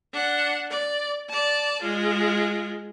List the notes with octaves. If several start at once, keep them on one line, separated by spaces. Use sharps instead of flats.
D4 F#5
D5
D5 A5
G#3 F4